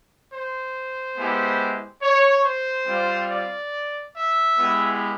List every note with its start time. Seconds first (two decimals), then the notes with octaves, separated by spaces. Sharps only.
0.31 C5
1.17 G#3 B3 E4 G4
2.02 C#5
2.44 C5
2.87 G3 C4 F4
3.30 D5
4.15 E5
4.59 G#3 B3 E4 G4